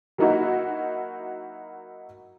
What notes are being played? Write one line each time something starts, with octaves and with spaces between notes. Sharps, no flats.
F#3 A#3 D#4 E4 F#4